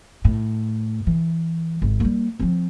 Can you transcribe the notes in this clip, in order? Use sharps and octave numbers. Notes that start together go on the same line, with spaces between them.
A2
E3
G#1
G3 A#3
F3 C4